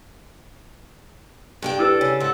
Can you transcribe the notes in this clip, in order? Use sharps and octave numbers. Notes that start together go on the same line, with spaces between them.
G2 D4 G5
E4 G4 A4 B4
C#3 C#5
G#2 A4 F#5